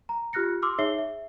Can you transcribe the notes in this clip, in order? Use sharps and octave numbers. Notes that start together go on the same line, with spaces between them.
A#5
F4 G4 F6 F#6 A#6 C#7
C6 D6 E6 F6
D#4 G#4 C#5 E5 C7 G7
E5